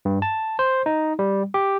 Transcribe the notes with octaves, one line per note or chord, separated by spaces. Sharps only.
G2
A5
C5
D#4
G3
G4